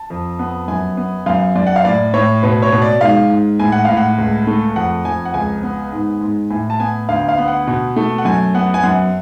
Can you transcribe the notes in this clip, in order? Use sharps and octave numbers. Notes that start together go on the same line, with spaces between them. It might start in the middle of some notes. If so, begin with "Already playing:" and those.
Already playing: A5
F2
B3
F#2 G#5
B3
F#2 F5
F#2 D5
F#5
F5
A2 D5
A2 C#5
B2 B4
C#5
B2
D5
G#2 F5
G#2
A2 G#5
F#5
A2 F5
F#5
C#2
A3
F2 F#5
F2 G#5
F#5
C#2 G#5
B3
G#2
G#2
A2 G#5
A5
B3 G#5
D2 F5
F5
B3
F#5
B2
A3
F#5
F#2 G#5
B3 F#5
G#5
F#2 F#5